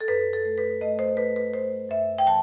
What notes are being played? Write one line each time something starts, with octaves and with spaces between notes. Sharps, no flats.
A4
F#2 B4
A4
A3
B4
A3 D#5
C5
A3 B4
B4
A3 C5
F#2 E5
G5
E3 A5